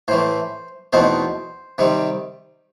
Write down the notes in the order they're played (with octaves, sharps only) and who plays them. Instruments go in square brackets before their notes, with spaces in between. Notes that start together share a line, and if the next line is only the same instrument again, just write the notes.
[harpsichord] A2 E3 A3 C5
E2 B2 A3 C4 D#4 C5
C3 D#3 G3 C4